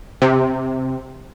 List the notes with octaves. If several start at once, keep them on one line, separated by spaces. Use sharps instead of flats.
C3